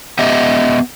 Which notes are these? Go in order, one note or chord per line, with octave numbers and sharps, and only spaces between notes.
B3 G4 D#5 E5